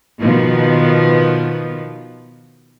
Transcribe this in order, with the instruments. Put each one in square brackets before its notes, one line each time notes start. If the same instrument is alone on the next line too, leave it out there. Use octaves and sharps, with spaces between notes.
[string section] B2 D#3 F3 B3